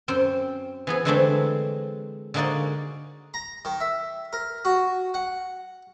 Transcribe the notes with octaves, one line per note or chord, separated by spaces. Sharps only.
F#2 C4 C5 G5
E3 B3 G#4
D3 E3 G#3 A3 C4 D4
D3 G#3 A#3 D#4 F#4 D5
A#5
D#3
E5
A#4
F#4
F#5